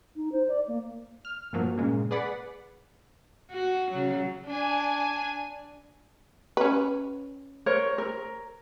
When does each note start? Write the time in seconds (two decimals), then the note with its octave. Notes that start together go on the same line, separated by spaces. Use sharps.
0.16 D#4
0.32 C5
0.48 D5
0.68 A#3
1.25 F6
1.53 G2 A#2 F3 F#3 A#3
1.78 A#2 C#3 G#3 A#3
2.11 G#4 B4 D5 F#5 B5
3.51 F#4
3.92 C#3 F#3
4.47 D4 G#5
6.57 C#4 B4
7.66 A#4 C5 C#5
7.98 A#4